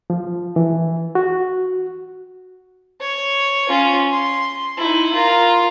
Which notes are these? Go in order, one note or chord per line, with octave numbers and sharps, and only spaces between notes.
F3
E3
F#4
C#5
C#4 F4
C6
D#4 E4
F4 A#4